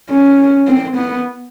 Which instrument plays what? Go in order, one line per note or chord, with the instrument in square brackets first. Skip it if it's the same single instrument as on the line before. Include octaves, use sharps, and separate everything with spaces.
[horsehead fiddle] C#4
C4
B3